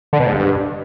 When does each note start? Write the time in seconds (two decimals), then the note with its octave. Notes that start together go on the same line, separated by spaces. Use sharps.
0.13 D3
0.20 B2
0.27 G#2
0.34 G2